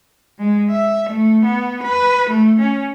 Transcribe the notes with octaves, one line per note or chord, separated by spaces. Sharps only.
G#3
E5
A3
B3
B4
A3
C#4